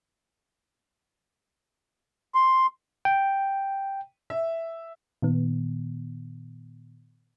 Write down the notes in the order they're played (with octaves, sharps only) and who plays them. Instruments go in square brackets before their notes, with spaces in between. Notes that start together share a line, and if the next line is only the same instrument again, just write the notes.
[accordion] C6
[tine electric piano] G5
[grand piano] E5
[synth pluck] A#2 D#3 B3